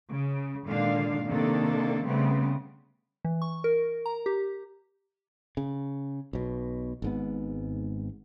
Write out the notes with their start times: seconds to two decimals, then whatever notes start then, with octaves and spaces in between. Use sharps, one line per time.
0.11 C#3
0.67 A#2 D3 D#3 G#3 D4 F5
1.27 C3 D#3 A#3 D4 A4
2.04 C#3 G3 A3 B3 C4
3.25 E3
3.42 C#6
3.64 A#4
4.06 A#5
4.26 G4
5.57 C#3
6.33 B1 B2
7.02 G#1 G#2 B3